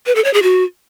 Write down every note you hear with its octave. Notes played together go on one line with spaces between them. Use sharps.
B4
A4
C#5
G#4
F#4